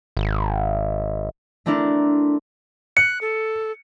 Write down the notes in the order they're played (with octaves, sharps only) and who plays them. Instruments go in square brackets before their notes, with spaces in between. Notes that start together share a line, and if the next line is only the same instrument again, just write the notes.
[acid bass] G#1
[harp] A3 C4 D4 E4 A#4
[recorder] F#6 [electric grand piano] C#7
[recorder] A4